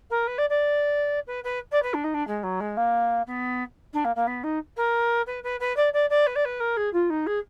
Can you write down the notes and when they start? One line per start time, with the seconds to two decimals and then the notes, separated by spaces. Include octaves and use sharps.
0.10 A#4
0.27 B4
0.38 D5
0.49 D5
1.27 B4
1.44 B4
1.71 D5
1.82 B4
1.94 D4
2.04 D#4
2.14 D4
2.27 G#3
2.43 F#3
2.60 G#3
2.77 A#3
3.27 B3
3.93 D4
4.04 A#3
4.16 A#3
4.27 B3
4.43 D#4
4.77 A#4
5.26 B4
5.43 B4
5.60 B4
5.76 D5
5.93 D5
6.10 D5
6.26 B4
6.35 D5
6.45 B4
6.60 A#4
6.77 G#4
6.93 F4
7.10 D#4
7.26 G#4